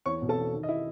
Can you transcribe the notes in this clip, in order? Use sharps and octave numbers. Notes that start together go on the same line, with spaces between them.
E2 C#5 C#6
B2
A4 A5
E2
D#3
D#5
E4 E5